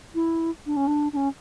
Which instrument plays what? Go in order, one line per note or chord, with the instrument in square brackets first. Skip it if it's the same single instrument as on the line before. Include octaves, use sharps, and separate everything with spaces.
[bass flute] E4
D4
C#4
D4
D4
C#4